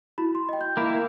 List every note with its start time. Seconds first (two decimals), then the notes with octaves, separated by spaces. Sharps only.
0.18 E4 F#4 B5
0.35 C6
0.49 D#5 G5
0.61 G6
0.77 A#3 E4